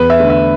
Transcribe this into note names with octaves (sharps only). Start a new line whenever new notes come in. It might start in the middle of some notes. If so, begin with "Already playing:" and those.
Already playing: E2 B4
E5
D3 A3
E5